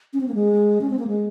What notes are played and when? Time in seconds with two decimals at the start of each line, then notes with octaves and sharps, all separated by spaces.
0.13 C#4
0.21 C4
0.28 A#3
0.34 G#3
0.81 C#4
0.90 C4
0.99 A#3
1.07 G#3